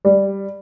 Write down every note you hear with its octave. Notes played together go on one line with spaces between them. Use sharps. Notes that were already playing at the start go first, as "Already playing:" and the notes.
G3